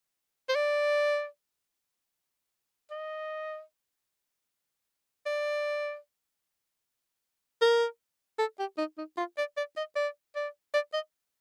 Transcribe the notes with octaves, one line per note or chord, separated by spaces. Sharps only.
C5
D5
D#5
D5
A#4
A4
G4
D#4
D#4
F4
D5
D5
D#5
D5
D5
D5
D#5